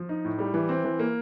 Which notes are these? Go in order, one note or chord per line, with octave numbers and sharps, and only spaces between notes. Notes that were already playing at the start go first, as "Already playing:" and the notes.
Already playing: F3
D#4
A2
G3
E3
C4
E3
A#3